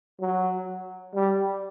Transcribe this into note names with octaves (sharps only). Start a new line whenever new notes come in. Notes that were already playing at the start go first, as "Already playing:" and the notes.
F#3
G3